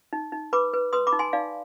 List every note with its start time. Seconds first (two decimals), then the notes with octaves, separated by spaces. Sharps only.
0.13 D#4
0.32 D#4
0.53 B4 B5 D6
0.74 B4
0.93 B4 C6 D#6
1.07 B5 D6
1.12 D#4
1.19 G#5 C6
1.33 D#4 D5 F5